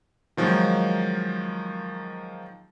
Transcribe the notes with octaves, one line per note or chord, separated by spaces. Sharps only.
D#3 F3 F#3 G#3 A#3